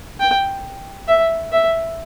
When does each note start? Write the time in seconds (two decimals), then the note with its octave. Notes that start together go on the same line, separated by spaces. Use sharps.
0.20 G5
1.08 E5
1.52 E5